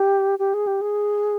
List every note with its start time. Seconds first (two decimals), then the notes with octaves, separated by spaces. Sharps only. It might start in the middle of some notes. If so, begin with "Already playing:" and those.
Already playing: G4
0.39 G4
0.54 G#4
0.67 G4
0.81 G#4